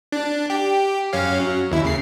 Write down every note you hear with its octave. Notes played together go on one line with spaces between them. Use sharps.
D4
G4
F#2 C#4 F5
F#3
D#2 E4
C#3 C7